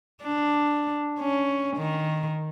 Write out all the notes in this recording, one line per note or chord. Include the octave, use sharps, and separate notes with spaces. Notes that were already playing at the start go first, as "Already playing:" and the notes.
D4
C#4
D#3